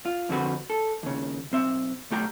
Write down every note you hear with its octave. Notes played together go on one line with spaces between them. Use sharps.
F4
F2 D3 C4 F#4 B4
A4
D#2 C#3
B1 C4 E5
B1 A3 G4 A#5